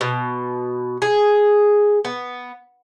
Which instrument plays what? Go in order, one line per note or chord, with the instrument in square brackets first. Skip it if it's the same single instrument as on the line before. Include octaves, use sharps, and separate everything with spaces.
[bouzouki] B2
G#4
B3